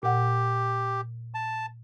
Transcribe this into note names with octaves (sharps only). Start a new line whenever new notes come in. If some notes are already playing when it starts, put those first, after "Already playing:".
A#2 G4 F#5
A5